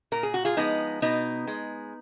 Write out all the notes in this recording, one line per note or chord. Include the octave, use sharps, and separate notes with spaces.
A#2 A#4
G#4
F#4
F4 G#4
F3 G#3 B3 D#4
B2 B3 D#4
G#3